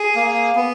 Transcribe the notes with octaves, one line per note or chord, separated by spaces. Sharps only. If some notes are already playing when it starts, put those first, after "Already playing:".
Already playing: G#4
A#3
B3